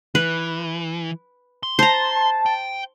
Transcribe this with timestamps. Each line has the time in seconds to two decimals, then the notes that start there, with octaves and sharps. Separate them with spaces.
0.15 E3 B4
1.63 C6
1.79 C5 A5 A#5
2.46 G5